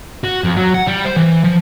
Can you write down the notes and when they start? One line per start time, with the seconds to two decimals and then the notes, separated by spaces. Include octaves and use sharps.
0.24 F#4
0.44 F2
0.57 F#3
0.74 F#5
0.87 G3
1.05 C5
1.16 E3
1.45 F3